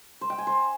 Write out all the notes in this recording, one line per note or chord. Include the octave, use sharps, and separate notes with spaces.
C5
G5
G#5
C5